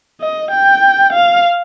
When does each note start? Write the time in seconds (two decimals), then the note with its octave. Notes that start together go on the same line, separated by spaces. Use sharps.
0.20 D#5
0.51 G5
1.12 F5